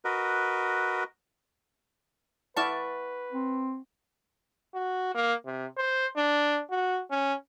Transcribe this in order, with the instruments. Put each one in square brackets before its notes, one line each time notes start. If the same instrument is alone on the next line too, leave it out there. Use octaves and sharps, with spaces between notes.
[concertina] F#4 A#4 B4 D#5
[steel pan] E4 D5 A5 [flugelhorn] B4 [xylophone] F#5 C#6 F6
[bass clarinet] C4
[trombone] F#4
A#3
C3
C5
D4
F#4
C#4